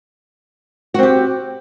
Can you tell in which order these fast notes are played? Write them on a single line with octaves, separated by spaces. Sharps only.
F#4 C4 G4